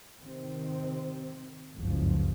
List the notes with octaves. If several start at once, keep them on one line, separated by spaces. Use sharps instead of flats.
C3 D#3 C4
F#1 C#2 G2 C#3 F3